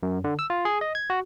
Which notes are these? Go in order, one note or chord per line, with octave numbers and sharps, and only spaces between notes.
F#2
D3
E6
F4
G#4
D#5
G#6
F#4